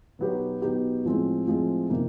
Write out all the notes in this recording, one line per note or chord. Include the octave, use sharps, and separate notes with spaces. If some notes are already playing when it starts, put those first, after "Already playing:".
B2 F#3 B3 D#4 G4
B2 F#3 B3 D#4 G4
A2 F3 G#3 C4
A2 F3 G#3 C4
C3 F3 A#3 D#4